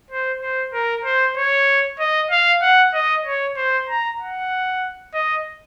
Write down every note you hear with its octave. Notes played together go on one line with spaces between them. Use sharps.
C5
C5
A#4
C5
C#5
D#5
F5
F#5
D#5
C#5
C5
A#5
F#5
D#5